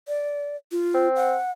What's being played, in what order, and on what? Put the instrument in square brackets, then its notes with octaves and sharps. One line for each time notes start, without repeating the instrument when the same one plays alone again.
[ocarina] D5
F4
[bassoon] C4
[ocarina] F#5